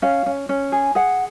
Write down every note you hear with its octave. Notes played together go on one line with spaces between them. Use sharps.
C#4 F5
C#4
C#4
G#4
G#4 F#5